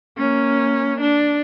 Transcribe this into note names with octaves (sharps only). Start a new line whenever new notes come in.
A#3 C#4
D4